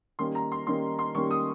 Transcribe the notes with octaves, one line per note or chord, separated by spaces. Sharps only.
D#3 G3 A#3 C#4 C6
A#5
C6
D#3 G3 A#3 C#4 C6
C6
D#3 G3 A#3 C#4 C#6
D#6